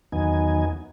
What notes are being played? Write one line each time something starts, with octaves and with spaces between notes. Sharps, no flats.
E2 D#3 F#3 B3 D#4 G#5